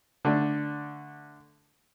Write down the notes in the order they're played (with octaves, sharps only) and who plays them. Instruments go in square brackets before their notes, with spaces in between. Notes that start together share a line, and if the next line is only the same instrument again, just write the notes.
[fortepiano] D3 A3 D4